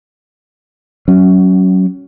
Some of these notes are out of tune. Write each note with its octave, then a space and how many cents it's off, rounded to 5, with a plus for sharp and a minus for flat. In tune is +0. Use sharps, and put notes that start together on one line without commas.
F#3 +15 C#4 +0